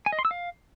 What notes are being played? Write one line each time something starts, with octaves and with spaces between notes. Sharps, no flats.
G#5
D#5
C6
E6
F5